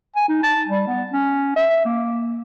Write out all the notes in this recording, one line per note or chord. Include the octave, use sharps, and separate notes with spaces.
G#5
D#4
A5
G3
B3
C#4
E5
A#3